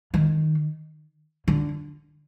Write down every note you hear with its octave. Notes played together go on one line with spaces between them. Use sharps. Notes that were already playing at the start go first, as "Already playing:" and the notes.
D#3
D3